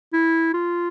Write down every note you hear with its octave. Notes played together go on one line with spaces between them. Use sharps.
E4
F4